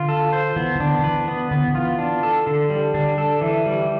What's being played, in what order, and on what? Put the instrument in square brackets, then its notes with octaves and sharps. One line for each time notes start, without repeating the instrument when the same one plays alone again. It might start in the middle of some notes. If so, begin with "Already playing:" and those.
Already playing: [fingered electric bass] D3 [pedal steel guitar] F4
[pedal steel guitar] A4
C5
[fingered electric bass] E3 [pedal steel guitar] B3
[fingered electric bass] E3
[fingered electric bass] D3 [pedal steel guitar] D4
[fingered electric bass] D3
[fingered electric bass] E3 [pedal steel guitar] B4
[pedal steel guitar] B3
[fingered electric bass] D3 [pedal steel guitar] B3
[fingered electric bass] D3
[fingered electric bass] E3 [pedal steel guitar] F4
[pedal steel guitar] D4
A4
D3
G3
[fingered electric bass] D3 [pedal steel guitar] D4
[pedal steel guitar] A4
E3
G3